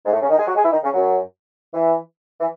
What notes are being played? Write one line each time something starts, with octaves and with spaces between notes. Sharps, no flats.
G#2 G#3
A2 A3
C#3 C#4
D#3 D#4
G#3 G#4
F#3 F#4
G#3 G#4
E3 E4
D#3 D#4
C#3 C#4
F#2 F#3
E3
E3